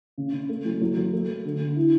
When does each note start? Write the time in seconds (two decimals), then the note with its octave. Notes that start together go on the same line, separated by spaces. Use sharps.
0.18 C#3
0.33 C#3
0.49 A3
0.65 F#3
0.81 F#3
0.97 F#3
1.13 A3
1.28 A3
1.45 D3
1.60 D3
1.76 E4